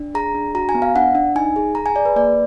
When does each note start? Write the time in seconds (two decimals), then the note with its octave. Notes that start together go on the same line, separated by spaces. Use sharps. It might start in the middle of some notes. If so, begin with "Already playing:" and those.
Already playing: D4
0.15 G#4 A#5
0.35 D4
0.55 F#4 A#5
0.69 G#5
0.75 B3
0.82 F5
0.95 D4 F#5
1.15 D4
1.35 D#4 G#5
1.56 G#4
1.75 G#4 A#5
1.86 G#5
1.96 G#4 D5
2.05 B4
2.16 A#3 D5